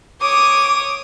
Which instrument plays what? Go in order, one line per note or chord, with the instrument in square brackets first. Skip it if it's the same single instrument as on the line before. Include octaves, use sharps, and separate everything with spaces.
[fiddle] C#5 D#6 [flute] D6